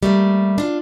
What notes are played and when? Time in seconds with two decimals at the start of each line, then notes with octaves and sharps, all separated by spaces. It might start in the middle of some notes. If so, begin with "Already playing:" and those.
0.03 G3 A3 A#3
0.58 D4 F4